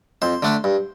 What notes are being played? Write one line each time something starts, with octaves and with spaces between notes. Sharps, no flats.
F2 C5
D3 A3 D4
G2